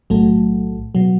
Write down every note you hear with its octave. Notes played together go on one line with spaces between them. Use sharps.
B1 A2 F#3 A3
B2 F#3